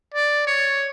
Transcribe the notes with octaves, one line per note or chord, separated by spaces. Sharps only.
D5
C#5